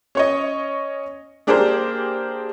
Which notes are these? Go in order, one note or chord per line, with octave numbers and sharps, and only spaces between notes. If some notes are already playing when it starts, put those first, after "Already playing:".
C#4 C#5 D#5
A#3 D4 G4 G#4 A#4 C5